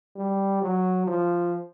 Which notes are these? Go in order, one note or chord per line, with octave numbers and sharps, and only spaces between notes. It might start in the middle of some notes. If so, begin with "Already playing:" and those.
G3
F#3
F3